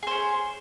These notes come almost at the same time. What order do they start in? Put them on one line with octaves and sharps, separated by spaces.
G#4 C5 C#4